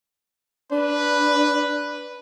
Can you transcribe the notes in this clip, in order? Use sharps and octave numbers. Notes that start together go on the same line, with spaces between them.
D4 B4